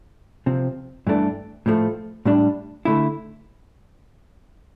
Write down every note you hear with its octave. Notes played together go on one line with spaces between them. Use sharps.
C3 F3 C4
G2 E3 A3 D4
A2 F3 A3
A2 G3 D4
D3 A3 E4